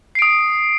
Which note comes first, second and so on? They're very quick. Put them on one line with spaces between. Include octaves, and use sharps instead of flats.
C7 D7 D#6